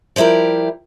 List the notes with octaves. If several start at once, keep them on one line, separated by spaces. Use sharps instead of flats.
F3 G3 E4 G4 A#4